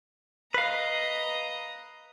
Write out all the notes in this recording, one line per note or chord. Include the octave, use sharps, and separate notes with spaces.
B4 D#5 F5 A#5